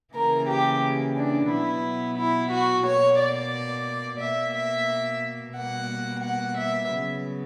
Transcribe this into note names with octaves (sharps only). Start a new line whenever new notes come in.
C#3 E3 A#3 A#4
G4
D4
B2 F#3 B3 E4
E4
F#4
B2 A#3 C#5
D5
B2 A#3 E5
E5
B2 G3 A#3 F#5
F#5
E5
C#3 F#3 B3